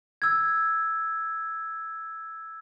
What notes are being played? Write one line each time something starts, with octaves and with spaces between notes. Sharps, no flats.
E6 G#6